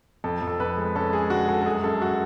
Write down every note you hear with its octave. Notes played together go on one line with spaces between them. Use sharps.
F2 A4
F2
A4
F2 B4
G#3
C#4 A4
G#3 G#4
D3 F#4
G#3 A4
A4
F#2 G#4
F#2 A4
F#4